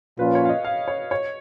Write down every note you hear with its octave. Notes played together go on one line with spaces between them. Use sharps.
A#2 F3 A#3 C#4 F4 B4
C#5
F5
D#5
F5
C#5
C#5